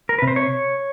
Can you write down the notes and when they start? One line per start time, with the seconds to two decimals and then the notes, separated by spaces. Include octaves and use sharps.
0.09 A#4
0.18 B4
0.22 C3
0.28 C5
0.36 C#5